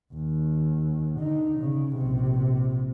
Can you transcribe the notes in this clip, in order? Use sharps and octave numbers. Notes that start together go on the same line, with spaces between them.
D#2
D3 D#4
C#3
A#1 C3